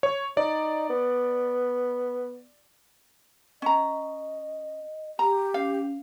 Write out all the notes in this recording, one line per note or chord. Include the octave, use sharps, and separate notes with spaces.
C#5
D#4 D5
B3
C#4 D#5 A#5
G4 A#5
C#4 F5